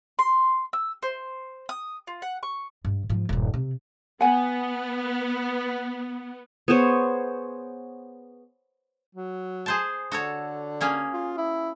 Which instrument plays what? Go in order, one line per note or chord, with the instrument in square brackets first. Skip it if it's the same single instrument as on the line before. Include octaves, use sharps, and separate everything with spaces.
[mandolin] C6
E6
C5
D#6
F4
F#5
C#6
[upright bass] G2
G#2 F3
D#1 G2
C3
[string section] B3 [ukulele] F#5 G#5
[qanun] B3 G#4 C5 C#5
[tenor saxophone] F#3
[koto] G#4 C5 A5
[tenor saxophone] D3 [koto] F#4 A4 C#5
[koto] A#3 C#4 G#4
[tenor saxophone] F4
E4